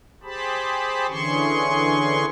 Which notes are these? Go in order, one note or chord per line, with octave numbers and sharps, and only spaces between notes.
G4 G#4 C5 A5 B5
D3 E3 C#4 G#4 C6 C#6